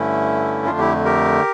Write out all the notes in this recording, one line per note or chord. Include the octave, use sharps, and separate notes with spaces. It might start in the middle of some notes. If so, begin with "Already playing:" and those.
Already playing: G2 D3 A3 C#4 E4
F2 D3 A3 D4 F4
E4 G4
G4 A#4